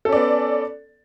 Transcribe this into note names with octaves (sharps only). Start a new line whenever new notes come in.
B3 C#4 A4 D5